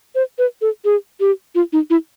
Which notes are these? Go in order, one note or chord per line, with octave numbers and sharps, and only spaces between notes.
C5
B4
A4
G#4
G4
F4
D#4
E4